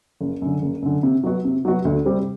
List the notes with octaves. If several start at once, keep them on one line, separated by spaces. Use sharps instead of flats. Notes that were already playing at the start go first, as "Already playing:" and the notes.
F#1
F#2 D3
F#1
F#2 D3
C3
F#3 B3 F#4
C3
F#3 B3 F#4
D2
C3 G3 C4 G4